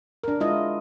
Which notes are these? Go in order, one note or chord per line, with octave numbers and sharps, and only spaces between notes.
D4 A#4
G#3 E4 F4 D#5